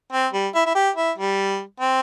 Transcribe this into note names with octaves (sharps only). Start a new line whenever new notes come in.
C4
G3
E4
E4
G4
E4
G3
C4